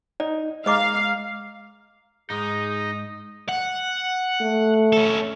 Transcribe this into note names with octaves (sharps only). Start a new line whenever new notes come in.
D#4 D5
G#3 D#5 F5 A#5 D6
G#2 G#3 D#4 G#4 D#6
F#5
A3
C#4 A4